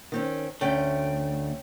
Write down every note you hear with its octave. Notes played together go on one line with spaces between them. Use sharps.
D#3 C4 C#4
D2 A3 C#4 G5